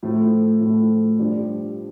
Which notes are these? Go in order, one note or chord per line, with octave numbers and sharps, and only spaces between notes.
A2 F3 A3
A2 F3 A3
G2 F3 D4 G4